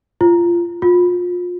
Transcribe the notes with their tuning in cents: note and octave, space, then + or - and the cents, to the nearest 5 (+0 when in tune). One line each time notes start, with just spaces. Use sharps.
F4 -20
F4 +30